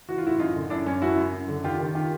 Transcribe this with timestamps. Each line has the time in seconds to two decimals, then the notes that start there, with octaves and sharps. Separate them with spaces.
0.09 E3 F#4
0.18 F4
0.24 A2 E4 F#4
0.39 F#2 D#4 F4
0.55 D3
0.70 F#2 D4 E4
0.86 F#2 C#4
1.01 F#2 E4 F#4
1.17 F#2
1.33 F#2
1.48 D3
1.64 D#3 F4 G4
1.80 D#3
1.95 D#3 F4 G4